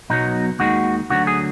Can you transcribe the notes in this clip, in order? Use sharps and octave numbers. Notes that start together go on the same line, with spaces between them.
B1 B2 F#3 D#4
D#2 D#3 G#3 F#4
D2 D3 F#3 F#4
G#4